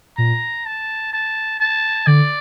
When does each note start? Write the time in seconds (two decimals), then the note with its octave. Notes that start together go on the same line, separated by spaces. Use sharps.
0.17 A#2 A#5
0.65 A5
1.13 A5
1.60 A5
2.07 D3 D5